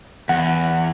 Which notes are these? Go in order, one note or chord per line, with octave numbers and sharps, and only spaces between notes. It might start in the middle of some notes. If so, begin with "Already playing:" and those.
E2 F#5